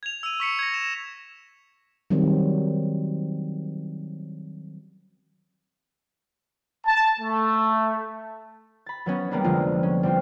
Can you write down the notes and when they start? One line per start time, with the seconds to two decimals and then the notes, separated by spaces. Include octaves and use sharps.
0.03 G#6 F7
0.23 E6 D#7
0.40 C#6 B6 C#7
0.59 G#6 A#6
0.74 E7
2.10 D#3 F#3 G3 C4
6.87 A5
7.19 A3
8.86 B5 A6
9.06 F#3 B3 C#4
9.31 G3 G#3 A#3 B3 C#4 D4
9.44 F1 D3 F3 G#3 F4
9.83 C#4
10.03 G3 C4 F4